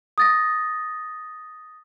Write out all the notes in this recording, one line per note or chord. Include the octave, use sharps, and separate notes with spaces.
D#6 A6 A#6